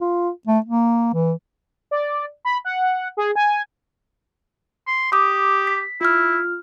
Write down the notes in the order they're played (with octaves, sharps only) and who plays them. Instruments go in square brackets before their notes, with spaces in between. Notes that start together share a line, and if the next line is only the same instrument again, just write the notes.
[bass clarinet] F4
A3
A#3
E3
[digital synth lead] D5
B5
F#5
G#4
G#5
[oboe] C6
[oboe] G4 [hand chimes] D6 D#6
[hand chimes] B6
[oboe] E4 [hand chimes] F4 F6